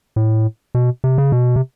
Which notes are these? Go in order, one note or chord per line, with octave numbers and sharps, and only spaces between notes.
A2
B2
C3
C#3
B2
C3